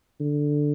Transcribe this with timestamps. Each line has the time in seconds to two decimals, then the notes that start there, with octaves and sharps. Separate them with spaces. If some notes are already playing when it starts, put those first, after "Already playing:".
0.20 D3